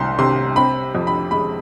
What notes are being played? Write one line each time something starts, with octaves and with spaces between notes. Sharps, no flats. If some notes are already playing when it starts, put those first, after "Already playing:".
Already playing: C2 C3 C6
C3 C6
C4 B5
F2
B5
G#3 B5